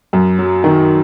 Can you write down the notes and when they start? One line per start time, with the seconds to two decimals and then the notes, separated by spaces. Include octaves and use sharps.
0.13 F#2
0.38 F#3
0.64 D#3